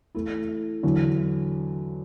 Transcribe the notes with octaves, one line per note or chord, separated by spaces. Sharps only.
E3 A3 E4
E2 D3 F#3 D4